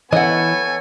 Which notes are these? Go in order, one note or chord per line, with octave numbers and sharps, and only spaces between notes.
E3 B3 A4 C#5 D#5 F#5 G#5